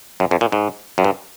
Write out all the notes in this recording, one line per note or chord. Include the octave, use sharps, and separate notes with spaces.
F#2
F2
A#2
G#2
F#2
G2